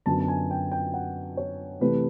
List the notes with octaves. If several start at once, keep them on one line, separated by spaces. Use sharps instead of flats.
F#2 D3 F#3 B3 A5
A5
G#5
G5
G5
F#5
C#5
C3 E3 A3 B4